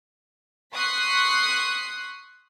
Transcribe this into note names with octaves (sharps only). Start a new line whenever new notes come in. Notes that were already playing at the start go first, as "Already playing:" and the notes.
C6 C#6 D#6 F#6 B6 C7